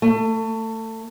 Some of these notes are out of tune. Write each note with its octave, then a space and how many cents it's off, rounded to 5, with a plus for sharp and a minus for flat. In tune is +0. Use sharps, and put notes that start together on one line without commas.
A3 +25